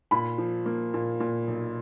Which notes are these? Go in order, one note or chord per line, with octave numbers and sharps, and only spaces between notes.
A#2 B5
F3
A#3
A#2
A#2
B1